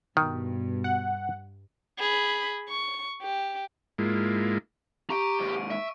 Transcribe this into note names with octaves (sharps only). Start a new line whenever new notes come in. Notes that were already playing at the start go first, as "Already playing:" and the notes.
G2 B2 D#3
F#5
G#4 B5
C#6
G4
G#2 G#3 A#3 E4 F4
G4 A#5 C#6 D7
D#2 G#2
E5